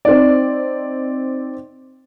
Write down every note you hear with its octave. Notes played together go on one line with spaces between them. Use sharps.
C4 D#4 D5